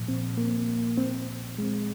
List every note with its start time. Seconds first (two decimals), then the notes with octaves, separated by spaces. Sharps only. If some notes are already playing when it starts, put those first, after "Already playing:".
Already playing: A#2 F3
0.08 C4
0.38 A#3
0.97 C4
1.58 G#3